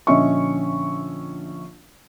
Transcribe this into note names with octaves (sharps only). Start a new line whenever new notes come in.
A#1 D3 C#4 D#5 E5 C#6